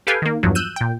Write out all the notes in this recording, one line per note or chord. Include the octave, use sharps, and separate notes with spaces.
G4 A4 B4 F5 G5 G#5
D#3 A#3
E2 G2 F3 F#3
E6 F#6 G6 D#7
A#2 G5